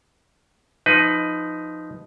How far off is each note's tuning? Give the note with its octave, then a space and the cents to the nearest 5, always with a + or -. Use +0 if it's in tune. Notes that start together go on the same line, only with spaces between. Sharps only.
F3 +0 D#4 +0 B4 +15